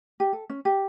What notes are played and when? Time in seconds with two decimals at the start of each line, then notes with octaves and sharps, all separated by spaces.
0.20 G4
0.33 A4
0.50 C#4
0.65 G4